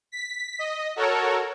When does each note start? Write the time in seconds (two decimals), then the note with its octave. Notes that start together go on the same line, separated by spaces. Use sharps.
0.12 B6
0.59 D#5
0.96 F#4 A4 A#4 C#5